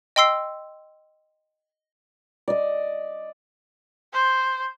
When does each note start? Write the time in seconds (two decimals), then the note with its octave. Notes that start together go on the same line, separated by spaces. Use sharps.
0.16 D#5 G5 C6 E6 C7
2.48 D5 D#5
4.13 C5